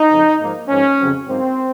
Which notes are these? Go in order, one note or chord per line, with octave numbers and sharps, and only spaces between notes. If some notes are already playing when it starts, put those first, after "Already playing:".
Already playing: D#4
F2 C#3 F3
G#2 F3 A#3
G#2 F3 A#3 C#4
F2 C#3 F#3 C4
G#2 F#3 A#3 C4